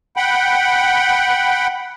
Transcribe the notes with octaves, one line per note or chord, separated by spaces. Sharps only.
F#5 G5 B5